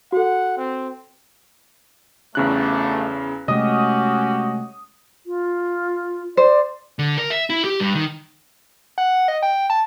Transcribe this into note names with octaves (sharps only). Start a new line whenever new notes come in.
F#4 A4 F#5
C4
G1 E2 C#3 A3 D4 F#6
C3 G#3 A3 C#4 F#4 G4 D#5 D#6
F4
C5 D5
D3
A#4
E5
E4
G4
G2
D#3
F#5
D#5
G5
A5